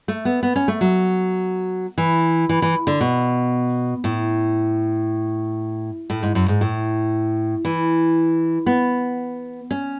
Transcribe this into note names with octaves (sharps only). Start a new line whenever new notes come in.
A3
B3
B3
C#4
A3
F#3
E3
E3
E3
D3
B2
A2
A2
G#2
F#2
G#2
A2
E3
B3
C#4